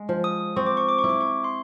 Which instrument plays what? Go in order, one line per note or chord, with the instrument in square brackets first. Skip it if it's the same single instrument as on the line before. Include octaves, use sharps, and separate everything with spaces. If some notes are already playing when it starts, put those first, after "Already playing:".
Already playing: [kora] G#3
F3
[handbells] D#6
[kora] C4 [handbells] C#6
[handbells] D6
C#6
D6
C#6
[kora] E4
[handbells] D6
C#6
C6